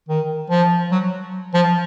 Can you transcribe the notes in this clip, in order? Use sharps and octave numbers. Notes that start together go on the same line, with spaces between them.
D#3
F3
F#3
F3